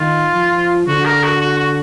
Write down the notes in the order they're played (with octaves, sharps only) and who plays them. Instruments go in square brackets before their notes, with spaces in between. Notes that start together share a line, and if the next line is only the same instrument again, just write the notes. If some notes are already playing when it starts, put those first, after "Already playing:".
Already playing: [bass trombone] D#3 [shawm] F4
[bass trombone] F3
[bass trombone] D3 [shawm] F#4
[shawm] A#4
F#4
F#4
F#4